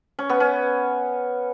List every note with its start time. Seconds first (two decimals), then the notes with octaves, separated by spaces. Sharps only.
0.19 C#4
0.30 B3
0.40 C#4